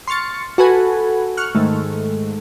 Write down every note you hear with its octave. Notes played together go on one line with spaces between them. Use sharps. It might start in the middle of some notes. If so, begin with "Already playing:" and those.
C6 C#6 F6 A6 C#7
F#4 A4 B4 G#5
C#6 F6 F#6
G#2 D#3 A3